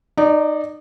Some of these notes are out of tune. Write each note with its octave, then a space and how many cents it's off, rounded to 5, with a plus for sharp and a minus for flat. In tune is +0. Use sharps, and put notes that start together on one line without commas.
D#4 -20 D5 +0